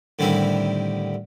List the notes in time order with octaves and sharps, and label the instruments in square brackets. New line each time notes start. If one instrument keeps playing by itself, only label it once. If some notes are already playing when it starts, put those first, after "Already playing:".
[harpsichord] A2 D3 D#3 G3 C4 E4